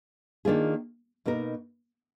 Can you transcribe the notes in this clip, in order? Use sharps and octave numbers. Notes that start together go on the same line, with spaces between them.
D#3 A#3 D4 F4 G#4
B2 A#3 D#4 A#4